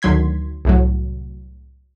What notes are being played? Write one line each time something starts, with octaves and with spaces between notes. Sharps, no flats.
D2 D#3 F#3 C6 G#6 B6
C2 A2 F#3